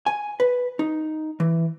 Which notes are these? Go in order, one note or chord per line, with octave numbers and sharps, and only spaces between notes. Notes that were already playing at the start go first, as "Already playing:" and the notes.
G#5
B4
D#4
E3